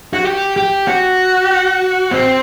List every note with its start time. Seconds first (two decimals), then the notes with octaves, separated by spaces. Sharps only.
0.14 F#4
0.25 G4
0.57 G4
0.88 F#4
2.11 C4